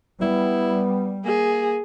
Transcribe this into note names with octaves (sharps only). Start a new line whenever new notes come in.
G3 B3 E4
A#3 G#4